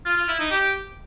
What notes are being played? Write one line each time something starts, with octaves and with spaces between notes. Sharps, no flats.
F4
F4
E4
D#4
G4